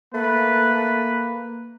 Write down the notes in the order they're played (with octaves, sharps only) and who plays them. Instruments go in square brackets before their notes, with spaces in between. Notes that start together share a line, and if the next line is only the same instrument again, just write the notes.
[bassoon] A3 [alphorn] A#3 [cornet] B4